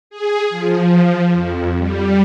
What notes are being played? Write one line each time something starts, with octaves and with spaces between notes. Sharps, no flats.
G#4
F3
F2
G3